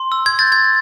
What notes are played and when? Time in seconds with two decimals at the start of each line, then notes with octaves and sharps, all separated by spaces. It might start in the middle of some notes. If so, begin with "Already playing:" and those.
Already playing: C6
0.12 E6
0.26 G#6
0.39 G6 A6
0.52 G#6